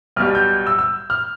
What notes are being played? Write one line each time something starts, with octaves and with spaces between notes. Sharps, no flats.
B1 B2 G3 F6
G6
E6
E6
F6